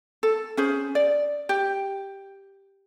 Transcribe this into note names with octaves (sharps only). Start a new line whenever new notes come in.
A4
C#4 G#4 C5
D5
G4